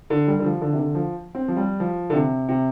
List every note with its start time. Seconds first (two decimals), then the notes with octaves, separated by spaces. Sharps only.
0.10 D3
0.28 G3
0.39 D3
0.44 F3
0.61 D3
0.73 C3
0.79 D3
0.95 F3
1.35 C4
1.48 F3
1.57 G3
1.80 F3
2.10 D3
2.13 C3
2.49 C3